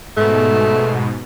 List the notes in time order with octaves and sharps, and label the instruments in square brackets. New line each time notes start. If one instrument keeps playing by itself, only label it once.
[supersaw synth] G#2 B2 [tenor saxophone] A3